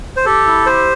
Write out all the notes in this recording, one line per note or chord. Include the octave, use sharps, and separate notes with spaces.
C5
G4 A4
E4
G4 C5